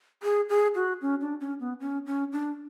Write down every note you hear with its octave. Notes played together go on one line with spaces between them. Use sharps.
G#4
G#4
F#4
C#4
D4
C#4
B3
C#4
C#4
D4